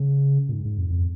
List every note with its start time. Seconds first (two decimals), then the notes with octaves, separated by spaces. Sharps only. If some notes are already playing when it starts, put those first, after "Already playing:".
Already playing: C#3
0.49 A#2
0.53 G#2
0.65 G#2
0.78 F2
0.90 F2